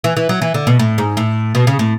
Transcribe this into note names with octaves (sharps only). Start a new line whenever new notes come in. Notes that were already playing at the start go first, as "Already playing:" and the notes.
E3
E3
F#3
E3
D3
B2
A2
G#2
A2
B2
C#3
A2